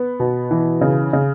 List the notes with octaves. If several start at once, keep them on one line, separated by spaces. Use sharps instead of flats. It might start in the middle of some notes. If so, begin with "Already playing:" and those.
Already playing: B3
B2
E3
C#3
C#3